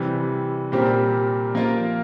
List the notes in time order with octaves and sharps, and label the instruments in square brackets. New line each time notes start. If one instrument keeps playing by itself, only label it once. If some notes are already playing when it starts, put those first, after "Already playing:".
Already playing: [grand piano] C3 E3 G3
A#2 G3 C4 G4 A#4
F3 A#3 F4 A#4